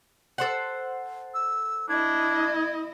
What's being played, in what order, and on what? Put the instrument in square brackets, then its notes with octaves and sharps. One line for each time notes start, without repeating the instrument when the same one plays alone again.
[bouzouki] A4 C5 F#5
[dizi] E6
[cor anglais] D4 [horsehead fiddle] E4 D#5 [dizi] G#6